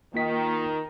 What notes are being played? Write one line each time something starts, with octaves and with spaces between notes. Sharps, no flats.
D#3 A#3 F4 B6